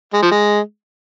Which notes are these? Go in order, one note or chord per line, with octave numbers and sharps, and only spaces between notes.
G#3
F3
G#3